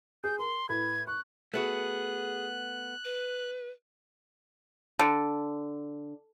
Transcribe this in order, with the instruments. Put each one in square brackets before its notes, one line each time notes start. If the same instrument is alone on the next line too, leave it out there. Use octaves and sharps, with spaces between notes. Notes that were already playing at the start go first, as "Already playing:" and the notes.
[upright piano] G#4 [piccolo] G6
[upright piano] A#4 [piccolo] C6
[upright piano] A2 B4 B5 [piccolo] G#6
[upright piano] C#6 [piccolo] F#6
[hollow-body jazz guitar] A3 B3 F#4 [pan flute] G#4 [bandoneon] F#6
[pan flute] B4
[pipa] D3